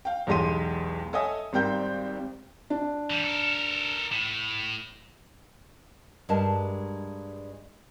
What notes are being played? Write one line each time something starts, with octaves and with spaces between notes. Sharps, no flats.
F5 G5
B1 E2 G#3 G4 C6 D#7
A4 C#5 D#5 E5 G#5 D#6
G#1 G3 C4 A#4 G5 G6
D4
E3 G3
A4 A#4
A2
G2 G#3 D4 A#4 D#5 A5